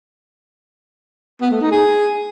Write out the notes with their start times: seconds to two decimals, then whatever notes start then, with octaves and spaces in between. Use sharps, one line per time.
1.41 B3
1.51 A3
1.61 D#4
1.71 G#4